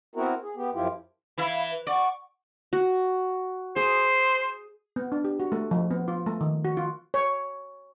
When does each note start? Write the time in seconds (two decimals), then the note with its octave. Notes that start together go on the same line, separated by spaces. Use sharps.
0.15 B3 C4 E4 F#4 A#4
0.42 G#4
0.56 B3 G4
0.74 F#2 F3 E4 F4 G4
1.38 E3 E4 E5 F5 B5
1.71 B4
1.87 D5 F#5 C#6
2.73 F#4
3.76 G#4 C5
4.96 B3
5.12 D4
5.24 G4
5.40 F#4
5.52 A3
5.71 F3
5.91 B3
6.08 F4
6.26 A3
6.41 D#3
6.65 F#4
6.77 F4
7.14 C#5